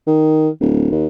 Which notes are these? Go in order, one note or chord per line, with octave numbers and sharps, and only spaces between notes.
D#3
D1
D#2